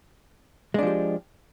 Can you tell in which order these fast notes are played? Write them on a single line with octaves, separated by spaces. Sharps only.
G#3 D4 F3 G4